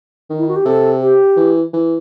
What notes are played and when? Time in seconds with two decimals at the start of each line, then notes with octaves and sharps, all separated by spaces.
0.30 D#3
0.38 E4
0.48 F#4
0.56 G4
0.65 C3 A4
1.01 G4
1.36 E3
1.73 E3